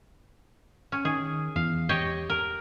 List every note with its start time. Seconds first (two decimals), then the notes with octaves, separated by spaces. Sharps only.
0.92 C#4
1.05 D#3 G#4
1.56 E2 F5
1.89 G4 C#5 D#5
2.30 A#4